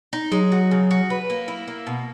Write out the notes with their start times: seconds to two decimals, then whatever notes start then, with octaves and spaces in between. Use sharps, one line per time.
0.13 D#4
0.31 F#3 G#3
0.52 F#4
0.71 C#3
0.91 F#4
1.10 B4
1.30 A#3
1.48 E4
1.68 A#3
1.87 B2